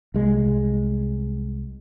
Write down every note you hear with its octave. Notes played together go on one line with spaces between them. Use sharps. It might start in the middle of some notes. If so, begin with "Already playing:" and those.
C2 G#3